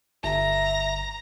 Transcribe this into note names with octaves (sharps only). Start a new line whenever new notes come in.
G1 E5 A#5